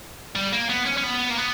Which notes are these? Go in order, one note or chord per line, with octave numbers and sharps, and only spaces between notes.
G3
A#3
B3
C#4
C#4
B3
A#3
B3